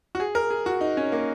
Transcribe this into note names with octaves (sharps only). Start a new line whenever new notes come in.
F#4
G#4
A#4
G#4
F#4
D#4
C#4
A#3